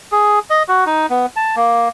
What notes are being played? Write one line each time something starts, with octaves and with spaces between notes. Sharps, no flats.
G#4
D#5
F#4
D#4
B3
A5
A#3